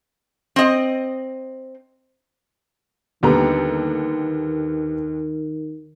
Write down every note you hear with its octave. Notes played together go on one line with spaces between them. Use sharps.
C4 D#5
D#2 D3 D#3 G3 B3 A4 A#5